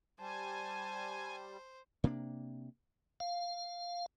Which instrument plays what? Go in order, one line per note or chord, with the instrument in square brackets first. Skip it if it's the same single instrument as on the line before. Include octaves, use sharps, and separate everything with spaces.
[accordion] G3 [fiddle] C5 [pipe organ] G#5 [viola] A5
[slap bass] C3 A#3 C4 D4
[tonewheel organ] F5